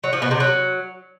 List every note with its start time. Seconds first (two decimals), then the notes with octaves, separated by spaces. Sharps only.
0.04 F#3
0.13 F3
0.22 B2
0.31 C3
0.40 F#3